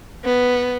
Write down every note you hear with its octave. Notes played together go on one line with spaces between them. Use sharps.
B3